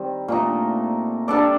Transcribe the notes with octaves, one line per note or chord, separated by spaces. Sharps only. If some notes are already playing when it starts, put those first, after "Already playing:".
Already playing: D#3 G3 C4
A#2 A3 D#4
G3 D4 A4 D5